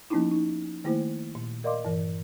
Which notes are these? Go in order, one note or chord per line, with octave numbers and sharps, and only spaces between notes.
F3 A#3 B3 C#4 D#4 E4
D#4
D#3 A3 A#3 E4 C5
A#2
A#4 D5 D#5 F5 C6 D6
G2 E3 A#4